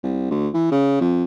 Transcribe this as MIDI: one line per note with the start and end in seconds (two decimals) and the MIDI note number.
0.03 0.30 36
0.31 0.48 38
0.54 0.71 52
0.72 0.99 49
1.00 1.24 41